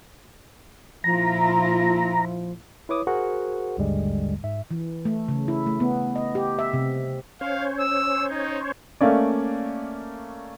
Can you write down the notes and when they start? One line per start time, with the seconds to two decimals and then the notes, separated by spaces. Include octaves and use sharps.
1.04 A#2 F3 E4 F4 A#5
2.89 E4 B4 C#5 D6 D#6
3.07 F#4 G#4 A#4 C5 F#5
3.77 A1 D#2 G#2 D3 G3 G#3
4.44 G#2 E5
4.71 E3
5.05 A3
5.28 C#3
5.48 E4
5.66 A3
5.80 B3
6.16 D#5
6.35 G4
6.59 E5
6.73 C3
7.41 C#4 C5 C#5 F5
7.80 E6
8.31 D#4
9.01 A3 A#3 C#4 D5